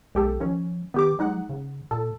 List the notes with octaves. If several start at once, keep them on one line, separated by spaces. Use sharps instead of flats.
B1 G#3 G4 A4
D#3 F3 C#4
D#3 B3 G4 D6
F#3 G#3 D#4 F#5
C#3
A#2 A4